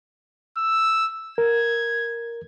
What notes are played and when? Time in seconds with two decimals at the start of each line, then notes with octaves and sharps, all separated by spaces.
0.57 E6
1.38 A#4 G#6